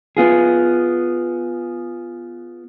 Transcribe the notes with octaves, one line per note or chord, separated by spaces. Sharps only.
B3 F4 G#4